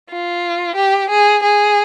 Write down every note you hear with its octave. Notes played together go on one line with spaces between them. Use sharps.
F4
G4
G#4
G#4